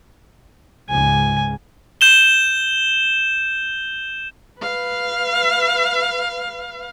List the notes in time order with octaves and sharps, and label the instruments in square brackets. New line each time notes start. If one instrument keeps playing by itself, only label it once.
[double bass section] C#2 G#2 C#3 [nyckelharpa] G#5
[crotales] G6 E7 G7
[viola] B4 F5